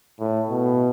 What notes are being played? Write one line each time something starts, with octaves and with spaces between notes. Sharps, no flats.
A2
B2